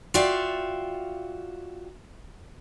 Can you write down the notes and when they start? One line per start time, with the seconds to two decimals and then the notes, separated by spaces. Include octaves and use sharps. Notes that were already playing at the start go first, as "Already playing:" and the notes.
0.14 F4 F#4 D5 E5 F5 G5